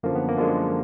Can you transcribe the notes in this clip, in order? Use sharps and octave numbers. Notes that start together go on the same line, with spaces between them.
F#2 D3 F3 A#3
B3
A#3
F#2 D3 F3 G#3